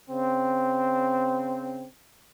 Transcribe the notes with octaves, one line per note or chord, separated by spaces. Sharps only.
C#3 C4